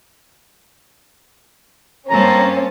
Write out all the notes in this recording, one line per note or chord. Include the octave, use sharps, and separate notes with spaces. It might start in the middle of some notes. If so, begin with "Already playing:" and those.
G2 A#3 C4 C#4 A5 A#5